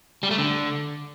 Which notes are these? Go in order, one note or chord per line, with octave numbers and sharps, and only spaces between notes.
G3
A3
D3